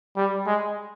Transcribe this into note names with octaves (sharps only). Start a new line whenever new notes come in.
G3
G#3